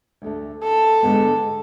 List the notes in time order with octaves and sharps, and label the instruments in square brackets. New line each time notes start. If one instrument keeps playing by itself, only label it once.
[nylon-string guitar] D2 D3 A3
[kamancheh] A4
[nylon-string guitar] D3 G#3 B3